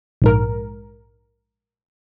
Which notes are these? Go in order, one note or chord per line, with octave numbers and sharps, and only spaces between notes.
A#1 G#2 A#4